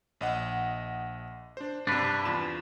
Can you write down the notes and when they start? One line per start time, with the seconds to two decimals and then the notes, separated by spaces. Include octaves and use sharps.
0.21 A#1 D#5 F#5
1.57 D4 C5
1.87 G2 C3 D4 B4
2.25 E2 F4 E7